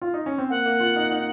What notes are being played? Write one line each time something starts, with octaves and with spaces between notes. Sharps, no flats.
F4
D#4
C#4
C4
A#3 F#5
A#3
F4
D#4
D#4